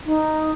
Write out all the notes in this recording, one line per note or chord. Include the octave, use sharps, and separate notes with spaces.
D#4